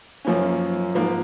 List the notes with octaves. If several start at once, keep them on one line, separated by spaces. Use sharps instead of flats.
F#2 F3 A#3 C#4
G#2 F3 A#3